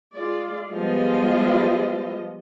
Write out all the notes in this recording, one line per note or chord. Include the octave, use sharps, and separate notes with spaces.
G#3 F4 D5
F3 G3 G#3 B3 F4 D#5